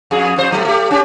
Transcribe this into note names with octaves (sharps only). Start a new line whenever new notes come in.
F2 G#4
F2 C5
A2 F#3 A3
A3 G4
C#4 G4